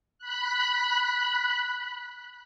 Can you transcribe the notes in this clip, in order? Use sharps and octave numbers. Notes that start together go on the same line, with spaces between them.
B5 F#6